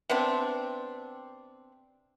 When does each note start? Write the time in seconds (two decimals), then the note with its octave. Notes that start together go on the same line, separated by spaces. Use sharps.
0.09 C3 B3 C4 D4